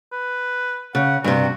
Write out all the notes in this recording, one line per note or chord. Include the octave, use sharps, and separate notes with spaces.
B4
C#3 F#5
G2 C3 F#4